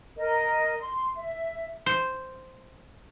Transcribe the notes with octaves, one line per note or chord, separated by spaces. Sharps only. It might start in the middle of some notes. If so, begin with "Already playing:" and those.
A#4 D#5
C6
E5
C5